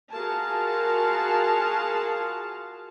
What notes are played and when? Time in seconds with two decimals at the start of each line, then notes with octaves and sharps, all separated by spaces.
0.11 F4 F#4 G#4 A#4 F5 A5